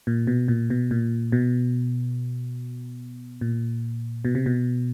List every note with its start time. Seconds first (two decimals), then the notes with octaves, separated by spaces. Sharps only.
0.07 A#2
0.27 B2
0.48 A#2
0.70 B2
0.91 A#2
1.32 B2
3.41 A#2
4.25 B2
4.35 C3
4.46 B2